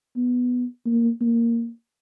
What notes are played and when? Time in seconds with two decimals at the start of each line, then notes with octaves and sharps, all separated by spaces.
0.16 B3
0.85 A#3
1.21 A#3